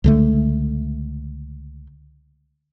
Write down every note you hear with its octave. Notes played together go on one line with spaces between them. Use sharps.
C#2 D3 A3